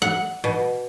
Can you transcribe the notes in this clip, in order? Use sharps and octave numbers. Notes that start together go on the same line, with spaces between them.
F#5
B2